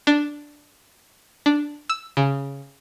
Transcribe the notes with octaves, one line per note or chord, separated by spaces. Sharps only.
D4
D4
E6
C#3